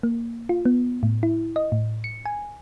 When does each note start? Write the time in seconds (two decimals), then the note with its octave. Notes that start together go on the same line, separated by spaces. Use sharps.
0.03 A#3
0.49 F4
0.65 B3
1.03 A2
1.23 E4
1.56 D#5
1.72 A2
2.04 C#7
2.26 G#5